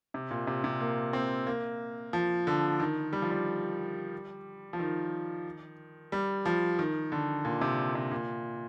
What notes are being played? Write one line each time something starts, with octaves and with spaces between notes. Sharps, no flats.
C3
A#2
C3
C3
A#3
C4
A#3
F3
D3
D#3
G3
F3
G3
F3
D#3
G3
F3
D#3
D3
A#2
C3
C3
A#2